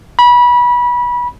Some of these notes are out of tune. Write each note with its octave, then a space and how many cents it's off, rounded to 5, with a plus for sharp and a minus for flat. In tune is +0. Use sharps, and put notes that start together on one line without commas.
B5 -25